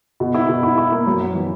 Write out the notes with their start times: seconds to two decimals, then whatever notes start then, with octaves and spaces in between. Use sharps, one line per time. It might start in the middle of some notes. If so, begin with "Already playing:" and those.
0.20 B2
0.34 E4
0.49 B2
0.63 E4
0.78 E4
0.92 A#3
1.07 F#2
1.21 F#2
1.35 E3